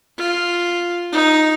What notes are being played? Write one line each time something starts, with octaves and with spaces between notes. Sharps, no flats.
F4
D#4